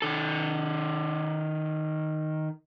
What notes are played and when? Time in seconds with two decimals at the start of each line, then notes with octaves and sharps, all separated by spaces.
0.02 D#3 A4